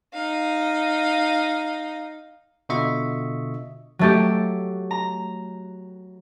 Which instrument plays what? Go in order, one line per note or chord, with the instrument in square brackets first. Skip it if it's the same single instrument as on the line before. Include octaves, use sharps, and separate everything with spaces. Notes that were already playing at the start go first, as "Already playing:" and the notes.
[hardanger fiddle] D#4 F5
[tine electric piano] B2 D3 F4 D#5 E5 C#6
[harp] F#3 A3 G4
A#5